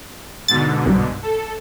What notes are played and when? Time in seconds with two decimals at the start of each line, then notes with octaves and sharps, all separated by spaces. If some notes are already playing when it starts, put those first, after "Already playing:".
0.48 G#2 B2 D3 A6
0.86 C2 G2
1.23 A4